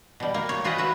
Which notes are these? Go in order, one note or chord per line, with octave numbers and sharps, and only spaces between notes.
B2 G3
A#3
C#5
F4 F#4 G#4 B4 D#5 F#5
F#4 B4 E5